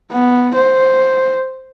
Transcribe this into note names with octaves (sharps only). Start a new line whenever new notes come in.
B3
C5